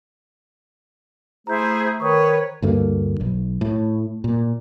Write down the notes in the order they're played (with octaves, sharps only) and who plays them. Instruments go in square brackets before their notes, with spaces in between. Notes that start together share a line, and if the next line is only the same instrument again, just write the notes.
[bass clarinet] A3 [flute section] E4 G#4 C5 [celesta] A#5 G6
[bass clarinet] D#3 [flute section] B4 C#5 [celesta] C#6 D#6
[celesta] C5
[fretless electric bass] D2 G2 A3 A#3
B1
A2
A#2